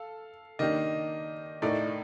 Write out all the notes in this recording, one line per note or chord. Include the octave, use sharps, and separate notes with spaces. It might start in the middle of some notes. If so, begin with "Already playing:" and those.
Already playing: A4 F5
D#3 A#3 D4 G4 D#5
A2 A3 D#4 A#4 D5